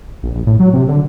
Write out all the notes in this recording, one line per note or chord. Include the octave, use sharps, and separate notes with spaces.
A#1
A#1
A2
F#3
C3
D3